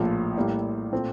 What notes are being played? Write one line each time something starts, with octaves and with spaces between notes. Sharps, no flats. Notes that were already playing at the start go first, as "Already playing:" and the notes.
Already playing: A#1 A2 F3 A#3 F4
A2 G3 A#3 E4
A#2 A3 C4